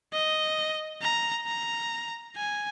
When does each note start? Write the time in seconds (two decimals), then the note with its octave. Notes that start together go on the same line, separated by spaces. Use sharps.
0.13 D#5
1.02 A#5
1.47 A#5
2.37 G#5